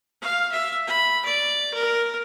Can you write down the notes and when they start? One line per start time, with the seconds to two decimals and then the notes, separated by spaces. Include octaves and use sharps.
0.22 F5
0.52 E5
0.87 B5
1.25 D5
1.74 A#4